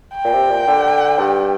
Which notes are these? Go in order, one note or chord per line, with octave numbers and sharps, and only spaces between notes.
G5
A#2
C3
A#2
D3
G2